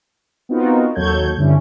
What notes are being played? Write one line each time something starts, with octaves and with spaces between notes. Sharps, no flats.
B3 C4 D#4 F4 F#4 A#4
D#2 F#3 A4 C#5 G6 G#6
G2 D3 C#4 E4